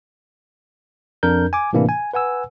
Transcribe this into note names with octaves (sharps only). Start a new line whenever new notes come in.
F2 D4 A#4 G6
G#5 D6
A2 C3 E3 A#3 D4 E4
G#5
B4 F#5 G#5 E6